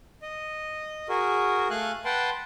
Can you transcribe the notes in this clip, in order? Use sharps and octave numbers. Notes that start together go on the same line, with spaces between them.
D#5
F#4 G#4 A#4
A3 F5 G#5 F#6
B4 F#5 G5 A5 C6